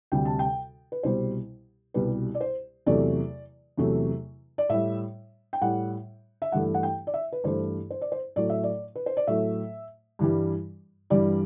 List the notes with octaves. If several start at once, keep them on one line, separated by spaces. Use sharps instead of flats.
D2 C3 G3 G5
A5
G5
B4
C2 B2 G3 C5
C2 B2 G3 B4
D5
C5
E2 C3 F#3 A3 D5
E2 C3 F#3 A3
D5
A2 G3 E5
G5
A2 G3 F#5
E5
G2 E3 A3 F#5
F#5
G5
D5
E5
B4
G2 E3 A3 C5
C5
D5
C5
A2 F#3 A3 D5
E5
D5
B4
C5
D5
A2 F#3 A3 E5
G2 E3 G3
G2 E3 G3 D5